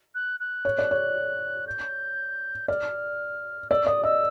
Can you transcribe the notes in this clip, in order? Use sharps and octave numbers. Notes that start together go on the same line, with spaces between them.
F#6
F#6
C#5
D5
C#5
G6
D5 F6
D5 E6
D5 D#6
D#5 E6